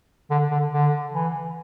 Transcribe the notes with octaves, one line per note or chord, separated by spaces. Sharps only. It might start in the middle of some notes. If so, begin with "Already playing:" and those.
D3
D3
D3
E3